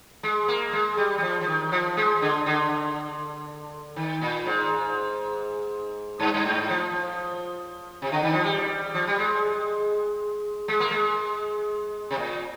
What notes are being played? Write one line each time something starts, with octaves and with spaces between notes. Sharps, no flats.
G#3
A#3
G#3
G3
G3
F3
F3
D#3
F3
G#3
D3
D3
D#3
A#2
G#2
G2
G2
G#2
F3
C3
D3
D#3
F3
G3
F3
G3
G#3
G#3
A#3
G#3
C3
A#2